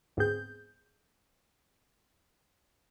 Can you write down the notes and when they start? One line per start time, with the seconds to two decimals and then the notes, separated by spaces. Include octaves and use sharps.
0.17 D2 G#2 B3 C4 G#4 G6